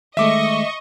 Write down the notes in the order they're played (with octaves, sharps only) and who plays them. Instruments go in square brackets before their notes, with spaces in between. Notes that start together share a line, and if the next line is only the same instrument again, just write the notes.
[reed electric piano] D#3 G#3 A3 [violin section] D#5 C#6 [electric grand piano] E5 D6